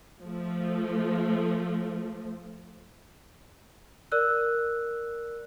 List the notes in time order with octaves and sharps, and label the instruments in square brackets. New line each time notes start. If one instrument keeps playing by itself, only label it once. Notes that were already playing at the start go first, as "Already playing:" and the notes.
[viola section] F3 A3
[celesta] A#4 D5 E6 F#6